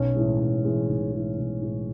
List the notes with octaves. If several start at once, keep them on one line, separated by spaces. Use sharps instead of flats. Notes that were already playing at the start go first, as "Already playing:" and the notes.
Already playing: B1 C#4
A2 E3 G#3
B1
A2 E3 G#3
B1
A2 E3 G#3
B1
A2 E3 G#3